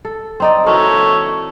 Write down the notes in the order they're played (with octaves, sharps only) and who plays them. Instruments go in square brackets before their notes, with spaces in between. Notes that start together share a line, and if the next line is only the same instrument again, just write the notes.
[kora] A4
C4 D#4 D5
[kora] E3 F#4 A#4 [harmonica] A4 C#5